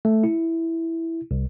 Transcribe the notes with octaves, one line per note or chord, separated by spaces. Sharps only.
A3
E4
C2